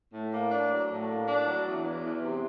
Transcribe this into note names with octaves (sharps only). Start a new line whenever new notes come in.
A2
A#3
D4
F#3
A2
A#3
D4
F#3
E2
E3
E2
C3